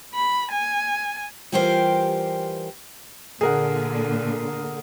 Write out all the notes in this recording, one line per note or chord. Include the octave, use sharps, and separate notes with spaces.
B5
G#5
E3 G3 F4 G4 A#4 C5
A#2 D3 G#4 A#4 F#5